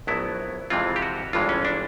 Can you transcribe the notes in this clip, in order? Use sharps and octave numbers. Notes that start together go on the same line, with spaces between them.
A#1 A2 F#3 B3 E4
F2 C3 E3 G#3 C4 F4
G4
F#4
G1 G2 E3 G#3 F4
C#4
D4